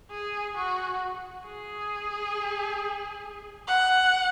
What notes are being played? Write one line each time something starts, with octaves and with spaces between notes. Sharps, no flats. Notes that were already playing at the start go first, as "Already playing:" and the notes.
G#4
F#4
G#4
F#5